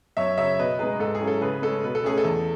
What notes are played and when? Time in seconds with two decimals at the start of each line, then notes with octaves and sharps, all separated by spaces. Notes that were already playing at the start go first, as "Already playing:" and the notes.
0.17 F#2 C#5 E5
0.38 C#3 F#3 C#5 E5
0.59 B2 B4 D#5
0.79 G#3 D#4 G#4 B4
1.00 G#2 A4
1.15 G#4
1.21 F#3 C#4 E4
1.27 A4
1.41 C#3 G#4 B4
1.62 G#3 C#4 A4
1.84 B2 B4
1.95 A4
2.04 A3 C#4 G#4
2.18 A4
2.25 E2